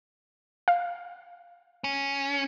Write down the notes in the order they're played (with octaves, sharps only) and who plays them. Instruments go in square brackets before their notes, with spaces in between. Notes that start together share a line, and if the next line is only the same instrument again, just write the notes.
[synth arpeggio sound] F5
[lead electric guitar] C#4